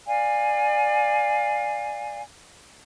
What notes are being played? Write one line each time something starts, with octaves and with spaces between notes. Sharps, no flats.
D5 F5 G#5